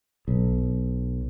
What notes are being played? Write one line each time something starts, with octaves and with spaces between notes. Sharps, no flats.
B1